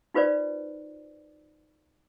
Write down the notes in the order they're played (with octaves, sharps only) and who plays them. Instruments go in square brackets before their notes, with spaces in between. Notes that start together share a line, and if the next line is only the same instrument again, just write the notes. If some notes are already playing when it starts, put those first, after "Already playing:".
[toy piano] D#4 F4 B4 C5 D5